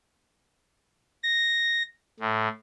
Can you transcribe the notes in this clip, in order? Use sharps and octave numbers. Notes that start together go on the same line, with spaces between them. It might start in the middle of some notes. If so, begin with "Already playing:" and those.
A#6
A2